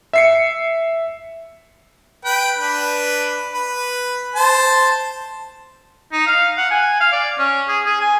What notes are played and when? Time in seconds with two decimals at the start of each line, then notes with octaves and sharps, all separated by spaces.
0.13 E5 C7 C#7
2.25 B4 G5
2.58 D4 B4
3.52 B4
4.35 C5 A5
6.12 D#4
6.27 F5
6.58 F#5
6.71 G#5
7.00 F5
7.12 D5
7.38 C#4
7.68 G#4
7.86 G#4
8.01 G#5